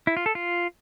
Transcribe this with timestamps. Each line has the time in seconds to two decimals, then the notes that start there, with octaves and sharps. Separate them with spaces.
0.07 E4
0.17 F4
0.26 A4
0.35 F4